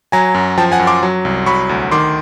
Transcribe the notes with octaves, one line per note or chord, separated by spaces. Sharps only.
F#3 G#5 A#5
F#2
F3 G5 A5
F#5 G#5
F#2
C6 D6
F#3
C2
F#3 B5 C#6
D2
D#3 C6 D6